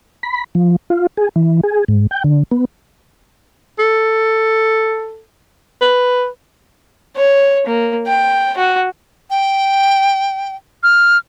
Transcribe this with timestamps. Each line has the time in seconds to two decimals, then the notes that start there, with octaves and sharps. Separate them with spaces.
0.23 B5
0.55 F3
0.90 F4
1.17 G#4
1.36 E3
1.63 G#4
1.88 G#2
2.11 G5
2.24 D3
2.51 B3
3.79 A4
5.81 B4
7.16 C#5
7.67 A#3
8.07 G5
8.57 F#4
9.30 G5
10.83 F6